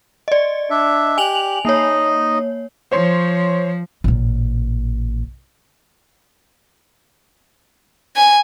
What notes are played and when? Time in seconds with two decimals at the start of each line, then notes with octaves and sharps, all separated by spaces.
0.28 D5 D#5
0.70 D4 E5
1.18 G4 G#5 F7 F#7
1.65 A#3 D#4 C#5 D#5
2.92 F3 C5 C#5 C6
4.04 A1 A#2
8.16 G#5